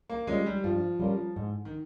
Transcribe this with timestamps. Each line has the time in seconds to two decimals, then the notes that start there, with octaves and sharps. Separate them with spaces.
0.10 A#3
0.27 G3 G#3 C#4 F4 A#4
0.46 G3
0.64 G2 F3
0.99 G3 C#4 F4 A#4
1.36 G#2
1.65 D#3